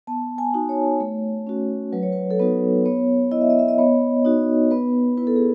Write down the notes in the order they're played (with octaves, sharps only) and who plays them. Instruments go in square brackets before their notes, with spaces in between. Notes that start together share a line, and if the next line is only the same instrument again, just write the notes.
[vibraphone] B3 A5
G#5
D#4 F#4
C#5
A3
C#4 F#4
F#3 B4
C#5
B4
A4
B3 D#4 F#4 B4
B3 C#5
E4 D#5
E5
D#5
E5
D#5
B3 C#5
D#4 F#4
B3 B4
E4 B4
A4
G#4